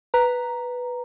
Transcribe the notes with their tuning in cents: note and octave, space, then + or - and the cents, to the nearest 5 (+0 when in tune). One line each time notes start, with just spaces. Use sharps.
B4 +0 A#5 +0